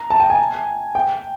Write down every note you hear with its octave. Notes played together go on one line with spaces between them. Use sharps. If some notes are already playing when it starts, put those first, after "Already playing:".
Already playing: A#5
A5
G5
G#5
G5